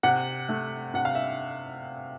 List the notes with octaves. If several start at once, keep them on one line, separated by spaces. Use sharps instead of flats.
C3 F#5
A3
C3 F#5
F5
E5